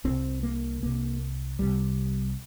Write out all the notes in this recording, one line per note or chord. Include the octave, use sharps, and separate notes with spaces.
C2 C3 C4
A#3
C2 C3 A#3
C2 C3 G3